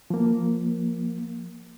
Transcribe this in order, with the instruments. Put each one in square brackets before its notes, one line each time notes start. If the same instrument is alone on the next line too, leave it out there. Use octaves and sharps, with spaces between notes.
[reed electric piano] F3 A#3